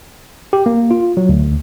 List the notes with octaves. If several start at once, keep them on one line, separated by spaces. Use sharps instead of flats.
G4
A#3
F4
F#3
D2